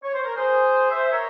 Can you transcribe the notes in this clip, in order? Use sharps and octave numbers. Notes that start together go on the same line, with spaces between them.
C#5
C5
A#4
G#4 C5
C5 E5
E5
A#4 C#5